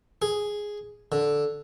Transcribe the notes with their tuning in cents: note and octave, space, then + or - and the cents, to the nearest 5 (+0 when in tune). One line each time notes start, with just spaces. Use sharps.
G#4 +0
D3 -5